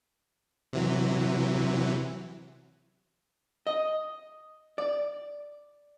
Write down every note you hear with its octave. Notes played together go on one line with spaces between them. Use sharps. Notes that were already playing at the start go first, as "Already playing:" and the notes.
C3 E3 F#3
D#5
D5